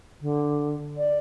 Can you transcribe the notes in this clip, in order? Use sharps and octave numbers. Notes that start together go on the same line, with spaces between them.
D3
D5